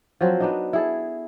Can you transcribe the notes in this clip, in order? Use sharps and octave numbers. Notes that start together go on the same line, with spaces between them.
F3 F#3 C4
B3 D4 D#4
E4 G#4 A4